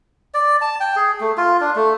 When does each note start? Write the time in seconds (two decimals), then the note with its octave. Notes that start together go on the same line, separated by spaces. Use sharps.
0.34 D5
0.61 A5
0.80 G5
0.96 G#4
1.20 A3
1.37 F4
1.61 D4
1.76 A3